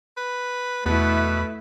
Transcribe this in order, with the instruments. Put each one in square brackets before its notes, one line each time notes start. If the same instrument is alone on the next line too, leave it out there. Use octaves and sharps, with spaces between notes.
[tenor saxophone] B4
[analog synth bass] E2 [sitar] B2 [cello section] A3 E4 [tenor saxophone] B4